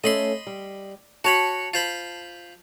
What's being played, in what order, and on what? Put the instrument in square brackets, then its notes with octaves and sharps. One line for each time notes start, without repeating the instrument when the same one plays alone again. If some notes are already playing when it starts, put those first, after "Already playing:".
[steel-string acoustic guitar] A3 C#4 [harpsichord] D#5 B5 C6
[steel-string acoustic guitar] G3
[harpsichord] F#4 C#5 B5 [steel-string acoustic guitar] A5
[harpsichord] F4 C5 B5